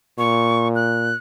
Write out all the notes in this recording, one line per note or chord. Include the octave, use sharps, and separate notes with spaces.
A#2 C#6
F#6